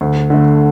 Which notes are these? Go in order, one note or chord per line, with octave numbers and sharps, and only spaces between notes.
D2
D3 A3